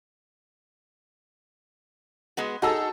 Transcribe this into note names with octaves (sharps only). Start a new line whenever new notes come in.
G#3 B3 F#4
D#4 F#4 G#4 A4 E6